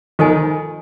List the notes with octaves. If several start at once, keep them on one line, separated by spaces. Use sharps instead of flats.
D#3 F4 A4 C5 D#5 G#5